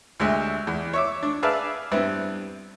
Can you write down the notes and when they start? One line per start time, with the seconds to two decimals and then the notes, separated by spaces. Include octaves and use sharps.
0.20 D2 C3 G#3 E5
0.67 E2
0.93 C#5 E5 D6
1.23 D4
1.43 G#4 B4 D5 E5 F5 A5
1.91 G2 B3 C4 E4